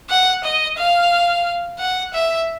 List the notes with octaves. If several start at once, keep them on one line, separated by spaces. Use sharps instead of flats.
F#5
D#5
F5
F#5
E5